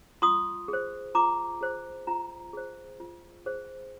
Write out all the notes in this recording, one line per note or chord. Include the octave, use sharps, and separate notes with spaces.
F4 C6 D#6
G#4 C5
F4 A#5 D6
G#4 C5
F4 G5 A#5
G#4 C5
F4
G#4 C5